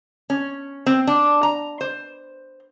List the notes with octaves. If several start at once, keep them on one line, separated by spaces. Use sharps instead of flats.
C#4
C4
D4
A#5
C5